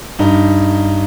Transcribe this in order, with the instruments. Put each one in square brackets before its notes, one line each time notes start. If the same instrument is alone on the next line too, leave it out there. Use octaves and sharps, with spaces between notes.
[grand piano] G2 D#4